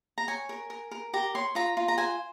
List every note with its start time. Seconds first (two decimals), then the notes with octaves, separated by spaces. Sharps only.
0.18 A#5
0.28 C#5 G#5
0.49 A#4
0.70 A#4
0.91 A#4
1.13 G4 A#5
1.35 C#5 C6
1.55 F4 A#5
1.77 F4
1.88 A#5
1.98 C5 G#5